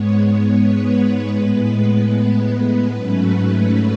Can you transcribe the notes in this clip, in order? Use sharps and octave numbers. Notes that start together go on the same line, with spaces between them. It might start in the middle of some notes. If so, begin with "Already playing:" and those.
Already playing: G#2 G#3 B3 C#5
B4
A2 G#3 B3
G#2 F#3 A3 C#4 B4